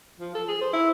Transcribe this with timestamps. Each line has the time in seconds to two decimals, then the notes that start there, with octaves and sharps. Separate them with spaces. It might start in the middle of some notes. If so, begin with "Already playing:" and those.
0.20 F3
0.35 A4
0.48 G#4
0.61 C5
0.73 E4